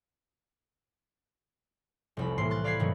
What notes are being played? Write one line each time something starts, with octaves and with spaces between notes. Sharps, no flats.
F1 C2 B5
A2 E3 A#3 C6 C7
C6 F#6 A6
D5 F5 B5 G#6 B6 C7
G2 B2 D#3 F#3 A3